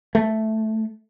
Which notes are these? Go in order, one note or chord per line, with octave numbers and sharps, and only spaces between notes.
A3